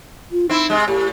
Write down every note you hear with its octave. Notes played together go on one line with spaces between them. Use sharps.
F4
C4 D#4 E4
C3 G#3
A2 G4